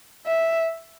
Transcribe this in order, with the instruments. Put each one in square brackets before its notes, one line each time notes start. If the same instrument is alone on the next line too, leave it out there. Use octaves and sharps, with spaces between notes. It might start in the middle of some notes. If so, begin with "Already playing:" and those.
[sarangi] E5